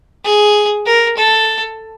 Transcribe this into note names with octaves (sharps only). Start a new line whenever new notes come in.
G#4
A#4
A4